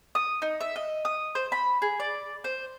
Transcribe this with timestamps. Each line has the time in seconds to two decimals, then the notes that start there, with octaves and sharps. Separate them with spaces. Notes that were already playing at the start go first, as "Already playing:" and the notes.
0.15 D#6
0.42 D#4
0.61 E5
0.76 D#5
1.05 D#6
1.35 C5
1.52 B5
1.82 G#4
2.00 D5
2.44 C5